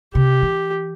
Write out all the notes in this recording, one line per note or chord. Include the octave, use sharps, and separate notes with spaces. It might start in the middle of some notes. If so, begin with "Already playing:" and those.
C3 G4
E3